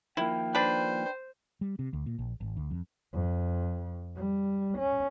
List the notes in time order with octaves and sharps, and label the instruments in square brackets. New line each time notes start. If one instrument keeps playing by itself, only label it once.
[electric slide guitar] D#3 F3 A#3 [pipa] E4 [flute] G5
[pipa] D4 B4 [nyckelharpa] C5
[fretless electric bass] G3
C3
D2
A#2
A#1
G#1
D2
F2
[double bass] F2
G3
C#4